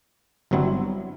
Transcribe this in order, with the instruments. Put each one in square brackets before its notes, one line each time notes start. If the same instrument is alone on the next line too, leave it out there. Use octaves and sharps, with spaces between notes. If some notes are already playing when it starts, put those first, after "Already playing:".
[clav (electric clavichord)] G1 G2 F#3 C4 E4